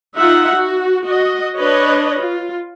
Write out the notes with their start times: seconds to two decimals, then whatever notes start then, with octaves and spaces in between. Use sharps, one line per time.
0.17 D#4 F4 E5 F#5
0.55 F#4
1.05 F#4 D#5
1.57 D4 B4 C#5 D#5
2.20 F4